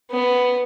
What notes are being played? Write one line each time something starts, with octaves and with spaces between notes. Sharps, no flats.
B3